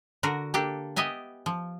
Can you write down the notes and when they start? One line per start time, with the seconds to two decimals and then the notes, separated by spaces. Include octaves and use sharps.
0.23 D3 F#4 A#4
0.54 A#3 D4 G4 A4
0.96 B3 G4 D#5 E5 G#5
1.46 F3